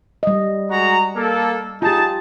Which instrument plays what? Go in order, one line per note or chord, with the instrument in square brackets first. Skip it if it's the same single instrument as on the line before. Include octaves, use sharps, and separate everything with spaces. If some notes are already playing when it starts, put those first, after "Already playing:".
[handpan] G3 D#5
[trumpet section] G#3 F#4 A#5
A#3 A4
[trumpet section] D#4 G#4 A5 [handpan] F4 G4